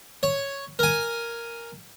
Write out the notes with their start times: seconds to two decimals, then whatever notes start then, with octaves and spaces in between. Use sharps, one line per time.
0.23 C#5
0.79 A#4 G#5